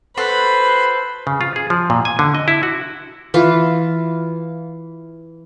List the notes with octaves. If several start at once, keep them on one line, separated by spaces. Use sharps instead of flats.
F#4 A4 B4 C5 B5 C6
C#3
F4
G#4
F3
A#2
G#5
D3
D#5
E4
F#4
E3 F4